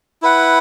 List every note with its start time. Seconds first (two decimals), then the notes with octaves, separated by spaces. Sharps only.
0.22 E4 B4 F#5